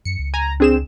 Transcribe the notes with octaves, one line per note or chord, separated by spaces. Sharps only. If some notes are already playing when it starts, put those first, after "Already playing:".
F#2 C#7
C#2
G#5 A#5
C4 D4 G#4 E7